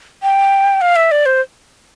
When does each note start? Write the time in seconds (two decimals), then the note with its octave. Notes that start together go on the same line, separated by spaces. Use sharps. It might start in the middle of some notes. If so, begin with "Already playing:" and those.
0.22 G5
0.81 F5
0.96 E5
1.11 D5
1.26 C5